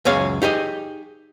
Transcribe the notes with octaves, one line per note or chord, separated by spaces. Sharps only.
C#2 F#2 G#4 C#5 F5
D#4 G4 G#4 D#5